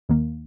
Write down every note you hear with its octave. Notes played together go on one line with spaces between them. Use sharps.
D#2 D#3 A#3